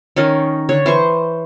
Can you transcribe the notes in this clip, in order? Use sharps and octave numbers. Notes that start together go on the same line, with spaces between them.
D#3 C#4 D#4 A#4
D3 C#5
E3 C5 C#6